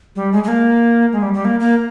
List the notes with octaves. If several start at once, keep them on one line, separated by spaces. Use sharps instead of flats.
G3
G#3
G#3
A#3
G#3
G3
G3
A#3
A#3